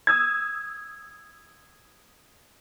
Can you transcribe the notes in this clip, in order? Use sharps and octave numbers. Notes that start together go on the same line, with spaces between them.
D#6 E6 G#6